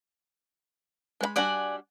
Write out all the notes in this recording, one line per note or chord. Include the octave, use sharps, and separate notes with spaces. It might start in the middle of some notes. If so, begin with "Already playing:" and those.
G#3 B4 B5
G3 D4 F#4 D5 F#5 G#5